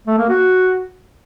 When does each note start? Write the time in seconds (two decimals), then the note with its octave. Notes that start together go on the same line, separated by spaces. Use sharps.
0.07 A3
0.18 A#3
0.29 F#4